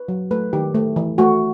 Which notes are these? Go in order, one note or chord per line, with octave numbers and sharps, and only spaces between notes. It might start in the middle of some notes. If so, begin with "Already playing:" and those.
Already playing: B4
F#3
A3 B4
D#3 G4
A3
E3
A3 F#4